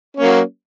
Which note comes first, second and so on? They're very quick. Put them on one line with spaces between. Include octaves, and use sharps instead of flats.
C#4 A#3 F#3